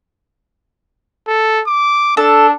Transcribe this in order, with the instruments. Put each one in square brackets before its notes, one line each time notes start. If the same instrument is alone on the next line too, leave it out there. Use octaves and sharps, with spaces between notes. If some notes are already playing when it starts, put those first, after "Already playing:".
[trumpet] A4
D6
[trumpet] D4 [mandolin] A4